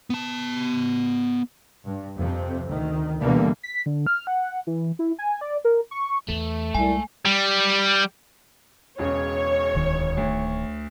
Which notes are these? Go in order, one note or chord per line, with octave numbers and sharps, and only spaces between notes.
B3 A5
G2
F2 C3 C4
D2 D#3
B2 D3 E3 G3 A#3
B6
D3
F6
F#5
E3
E4
G#5
D5
A#4
C#6
E2 A3
C2 G#3 G#5
G3
E1 C#3 C#5
D1 D#3
D2